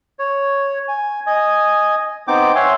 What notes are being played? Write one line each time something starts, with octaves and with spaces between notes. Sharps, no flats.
C#5
G#5
D#5 G#5
B3 C4 D#4 G5 D6
C#5 E5 F#5 G#5 C6